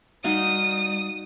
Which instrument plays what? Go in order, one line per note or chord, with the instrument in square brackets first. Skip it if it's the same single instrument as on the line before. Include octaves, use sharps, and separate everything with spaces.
[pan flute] G3 [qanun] D#4 F#4 F5 [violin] D#6